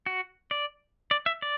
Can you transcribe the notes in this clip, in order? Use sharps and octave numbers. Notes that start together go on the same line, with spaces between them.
F#4
D5
D5
E5
D5